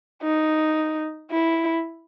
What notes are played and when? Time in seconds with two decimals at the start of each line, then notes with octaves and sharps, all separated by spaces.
0.23 D#4
1.31 E4